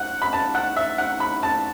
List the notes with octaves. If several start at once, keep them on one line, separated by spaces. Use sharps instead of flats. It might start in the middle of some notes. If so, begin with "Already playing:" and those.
Already playing: F#5
B5
A5
F#5
E5
F#5
B5
A5